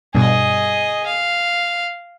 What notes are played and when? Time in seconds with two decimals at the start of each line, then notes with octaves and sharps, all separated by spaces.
0.15 G2 B2 G#4 D#5
1.06 F5